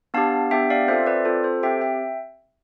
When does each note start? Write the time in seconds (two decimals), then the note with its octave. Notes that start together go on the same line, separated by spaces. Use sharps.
0.14 B3 D4 G4 F5 A5
0.51 B3 D4 G4 E5 G5
0.70 D5 F5
0.88 C4 F4 A4 C5 E5
1.06 B4 D5
1.25 C4 F4 A4 C5
1.44 A4 C5
1.63 C4 G4 E5 G5
1.81 E5 G5